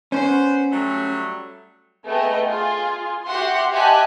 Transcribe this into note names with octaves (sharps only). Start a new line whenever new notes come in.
B3 C#4 C5
F#3 G3 A3
A3 B3 G#4 D#5 G5
F4 G#4
F#4 G4 E5 F#5 C6
G4 D#5 E5 G#5 A5 F#6